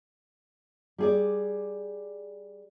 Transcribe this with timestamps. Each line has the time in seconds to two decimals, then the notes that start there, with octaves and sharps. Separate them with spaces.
0.98 G3 G#4 D5